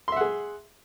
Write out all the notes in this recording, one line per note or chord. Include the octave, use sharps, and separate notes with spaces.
G#4 E5 F#5 C6